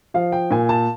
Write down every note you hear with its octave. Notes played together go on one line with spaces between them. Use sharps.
F3 F5
G5
A#2 G#5
A5